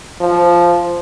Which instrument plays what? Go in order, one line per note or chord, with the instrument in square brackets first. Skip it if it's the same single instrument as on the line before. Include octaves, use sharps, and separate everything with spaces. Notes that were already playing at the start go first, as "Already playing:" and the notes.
[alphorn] F3